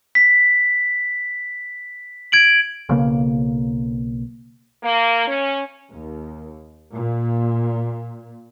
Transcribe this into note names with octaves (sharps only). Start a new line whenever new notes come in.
B6
G#6 D7 F#7
B1 C#3 A#3
A#3
C#4
D#2
A#2